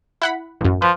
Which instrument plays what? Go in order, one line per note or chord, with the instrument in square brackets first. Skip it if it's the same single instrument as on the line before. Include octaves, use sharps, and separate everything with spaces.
[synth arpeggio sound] E4 F#5 B5
A1 F#2
[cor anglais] F3 [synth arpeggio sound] B4